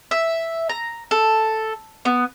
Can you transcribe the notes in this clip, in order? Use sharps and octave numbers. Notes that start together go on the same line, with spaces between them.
E5
A#5
A4
B3